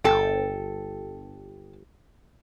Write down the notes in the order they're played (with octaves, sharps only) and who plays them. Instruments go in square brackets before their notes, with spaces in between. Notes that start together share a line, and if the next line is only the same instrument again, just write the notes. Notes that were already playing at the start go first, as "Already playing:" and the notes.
[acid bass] G1 [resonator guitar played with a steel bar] A4 G5